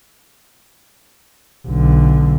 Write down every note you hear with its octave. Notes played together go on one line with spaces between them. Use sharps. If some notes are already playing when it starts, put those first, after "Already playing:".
B1 D3